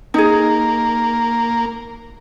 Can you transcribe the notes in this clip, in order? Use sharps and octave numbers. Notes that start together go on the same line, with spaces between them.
A#3 D#4 G#4